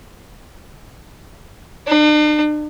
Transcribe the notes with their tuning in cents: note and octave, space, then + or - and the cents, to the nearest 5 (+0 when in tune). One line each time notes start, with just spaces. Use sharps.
D4 +45